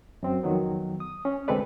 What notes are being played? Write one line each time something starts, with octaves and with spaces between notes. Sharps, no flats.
F#2 C4
F2 D#3 F#3 B3
D#6
C#4
D2 G#3 C4 A4 B4 D5